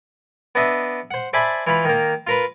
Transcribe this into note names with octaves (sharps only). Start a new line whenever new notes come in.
B3 D4 D#5 E5
C5 F#5
C5 D5 E5 G#5 A5 B5
E3 F4 B5
D#3 A#3
F4 A#4 B4